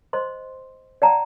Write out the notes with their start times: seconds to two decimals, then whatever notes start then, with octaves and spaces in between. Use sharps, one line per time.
0.13 C5 D#5 C6
1.02 D5 F#5 G5 A5 A#5